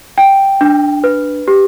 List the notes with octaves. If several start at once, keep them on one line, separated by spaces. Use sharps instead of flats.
G5
D4
B4
G4